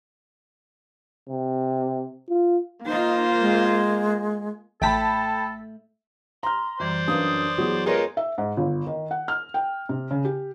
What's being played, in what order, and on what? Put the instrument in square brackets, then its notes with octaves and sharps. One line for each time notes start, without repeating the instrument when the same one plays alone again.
[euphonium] C3
F4
[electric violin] A#3 [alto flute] D#4 [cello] F4 C5
[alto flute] G#3
[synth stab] A1 B6 [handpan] A3 E5 [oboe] A4 [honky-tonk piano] G5 A5 B5
[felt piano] A#5 F6 [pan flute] C6
[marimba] F#2 E3 G3 [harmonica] C5 D5
[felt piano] F#2 D4 [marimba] D#4 B4 F5 [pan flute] D#6
[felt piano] E3 F#3 [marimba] B3 G#4
[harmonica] G#3 D#4 F4 [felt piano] G#4 C#5 [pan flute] A#4 [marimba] B4
[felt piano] E5
G#2
G1
D#3
F#5
F6
G5
C3
C#3
G4